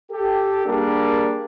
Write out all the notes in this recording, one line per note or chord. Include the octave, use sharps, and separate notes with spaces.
G4 A4
G3 A#3 D4 G#4 A#4